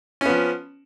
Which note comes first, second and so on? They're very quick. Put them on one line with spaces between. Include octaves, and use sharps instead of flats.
C#4 B3 F3